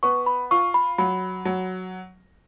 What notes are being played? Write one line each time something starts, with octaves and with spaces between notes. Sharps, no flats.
B3 C#6
B5
F4 C#6
B5
F#3 B5
F#3